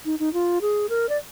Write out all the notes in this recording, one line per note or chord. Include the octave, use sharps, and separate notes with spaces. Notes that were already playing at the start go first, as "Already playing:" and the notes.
D#4
D#4
F4
G#4
A#4
D5